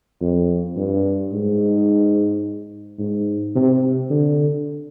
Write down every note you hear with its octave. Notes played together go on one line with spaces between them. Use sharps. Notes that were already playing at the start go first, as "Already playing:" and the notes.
F2
G2
G#2
G#2
C3
D3